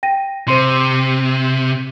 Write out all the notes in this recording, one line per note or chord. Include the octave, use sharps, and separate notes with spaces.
G5 A#6 D#7
C3 C5 C6